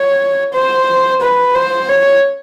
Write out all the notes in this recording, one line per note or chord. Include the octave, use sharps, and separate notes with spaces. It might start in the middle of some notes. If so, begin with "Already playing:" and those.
Already playing: C#5
C5
B4
C5
C#5